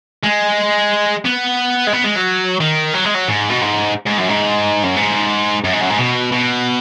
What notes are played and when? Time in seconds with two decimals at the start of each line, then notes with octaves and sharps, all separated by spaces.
0.24 G#3
1.25 B3
1.87 G#3
1.93 B3
2.04 G#3
2.16 F#3
2.61 D#3
2.94 F#3
3.04 G#3
3.14 F#3
3.28 G#2
3.50 B2
3.62 G#2
4.07 G#2
4.18 F#2
4.29 G#2
4.84 F#2
4.97 G#2
5.64 F#2
5.73 G#2
5.81 F#2
5.90 G#2
5.98 B2
6.32 B2